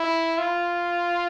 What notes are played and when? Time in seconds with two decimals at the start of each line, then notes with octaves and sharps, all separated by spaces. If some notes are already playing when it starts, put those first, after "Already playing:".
Already playing: E4
0.39 F4